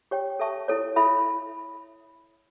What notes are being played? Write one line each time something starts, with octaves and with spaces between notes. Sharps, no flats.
G4 C#5 G5
A4 E5 A5 C#6
E4 A4 C#5
E4 A4 E5 B5